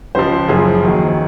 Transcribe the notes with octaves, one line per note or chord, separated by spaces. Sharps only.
C#2 C#3 F3 C5
F#1 F#2 F3 G#4
D#2 D#3 F#3